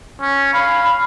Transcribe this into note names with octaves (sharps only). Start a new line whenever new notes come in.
C#4
F5 B5